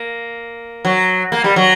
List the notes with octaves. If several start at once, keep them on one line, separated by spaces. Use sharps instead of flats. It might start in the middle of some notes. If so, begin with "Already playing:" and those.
Already playing: A#3
F#3
A#3
G3
F#3